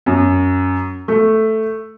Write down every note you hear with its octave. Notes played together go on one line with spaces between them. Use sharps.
F#2
A3